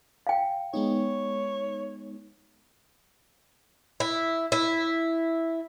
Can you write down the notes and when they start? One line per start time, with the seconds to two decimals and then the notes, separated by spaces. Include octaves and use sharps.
0.27 F5 G5
0.74 G#3 B3 D#4 C#5
4.00 E4
4.52 E4